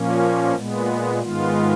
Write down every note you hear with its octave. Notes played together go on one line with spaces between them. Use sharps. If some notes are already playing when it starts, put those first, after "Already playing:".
Already playing: A#2 F3 A#3 C#4
A#2 G#3 B3
G#2 D#3 G#3 B3 F4